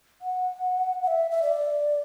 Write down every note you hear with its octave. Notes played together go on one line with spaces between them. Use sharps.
F#5
F#5
E5
E5
D5